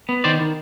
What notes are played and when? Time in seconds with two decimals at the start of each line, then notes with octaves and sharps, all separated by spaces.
0.09 B3
0.24 D#3 C5 D5
0.41 D#3